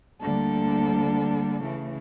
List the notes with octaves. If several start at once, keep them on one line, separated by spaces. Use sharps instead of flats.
D2 D3 G3 A#3 A4
C#3 E3 A3